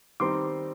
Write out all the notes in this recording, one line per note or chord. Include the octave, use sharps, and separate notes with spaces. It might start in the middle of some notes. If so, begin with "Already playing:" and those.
D#3 G3 C4 D#4 C6 D6